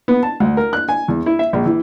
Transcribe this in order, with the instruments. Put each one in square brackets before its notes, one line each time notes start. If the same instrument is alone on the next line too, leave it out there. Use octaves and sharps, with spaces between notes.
[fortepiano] B3
A5
D2
A#4
F#6
G#5
E2
E4
E5
A#1
E3